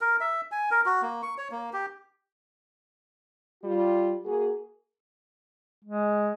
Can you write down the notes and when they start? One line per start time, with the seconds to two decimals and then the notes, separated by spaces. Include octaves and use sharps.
0.01 A#4
0.20 E5
0.52 G#5
0.71 A#4
0.86 F#4
1.02 A#3
1.22 C#6
1.38 C#5
1.51 A#3
1.73 G4
3.64 G3 F4
4.25 A#3 F#4 G#4
5.85 G#3